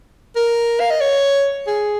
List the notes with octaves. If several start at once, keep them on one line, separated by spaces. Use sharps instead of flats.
A#4
F5
D#5
C#5
G#4